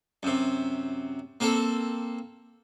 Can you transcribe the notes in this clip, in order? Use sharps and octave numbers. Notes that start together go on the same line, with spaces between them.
F#2 C3
A#3 C4 A4